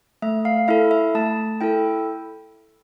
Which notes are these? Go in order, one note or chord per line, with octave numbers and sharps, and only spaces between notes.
A3 E5
F5
E4 A4 E5
E5
A3 A5
E4 A4 G5